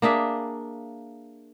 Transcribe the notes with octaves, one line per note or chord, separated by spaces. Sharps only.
A#3 D4 G#4 E5